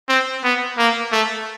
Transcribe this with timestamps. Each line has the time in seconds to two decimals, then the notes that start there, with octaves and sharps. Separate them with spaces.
0.09 C4
0.44 B3
0.78 A#3
1.12 A3